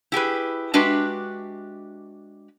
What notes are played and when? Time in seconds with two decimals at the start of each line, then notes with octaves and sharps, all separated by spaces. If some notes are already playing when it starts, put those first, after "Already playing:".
0.12 E4 G4 G#4 B4
0.74 G#3 D4 F#4 G4 B4 E5